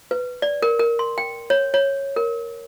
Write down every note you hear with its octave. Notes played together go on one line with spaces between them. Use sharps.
B4
D5
A#4
A#4
C6
G5
C#5
C#5
A#4